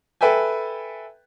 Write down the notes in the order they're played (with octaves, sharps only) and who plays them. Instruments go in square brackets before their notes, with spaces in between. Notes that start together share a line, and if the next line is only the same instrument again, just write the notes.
[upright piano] A4 B4 E5 G5 G#5